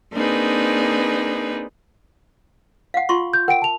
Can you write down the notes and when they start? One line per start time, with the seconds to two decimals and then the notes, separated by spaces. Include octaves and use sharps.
0.13 A#3 C4 D4 D#4 G#4 B4
2.94 F5 F#5
3.09 F4 C6 C#6
3.34 G6
3.48 A#4 F#5 G5 D7
3.62 A5 F7